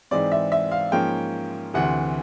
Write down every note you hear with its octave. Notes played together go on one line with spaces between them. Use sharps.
G#2 E3 G#3 C4 D5
E5
E5
F5
G#2 F3 A#3 C#4 G5
D2 C3 E3 F#5